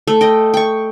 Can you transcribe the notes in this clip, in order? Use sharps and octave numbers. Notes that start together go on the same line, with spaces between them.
A3
D#5 G5
G5 C#6